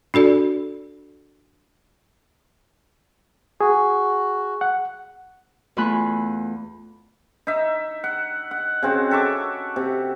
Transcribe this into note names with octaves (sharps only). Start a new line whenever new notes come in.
D4 F#4 A4 D5
F#4 G#4
F#5
E2 A3 F4 G#5 B5 F#6
D#4 E5
F#5
F#5
C#3 C4 F#4
A4 E5 C#6 D6
C3